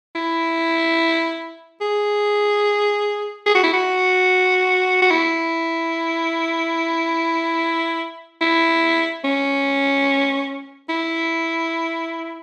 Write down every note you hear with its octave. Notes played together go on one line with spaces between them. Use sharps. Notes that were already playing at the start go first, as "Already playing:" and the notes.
E4
G#4
G#4
F#4
E4
F#4
F#4
E4
E4
C#4
E4